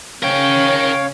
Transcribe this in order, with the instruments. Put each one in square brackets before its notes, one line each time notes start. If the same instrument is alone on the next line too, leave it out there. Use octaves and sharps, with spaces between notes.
[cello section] C#3 C#4 [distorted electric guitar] A#4 G5 [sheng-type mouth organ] C#5 F5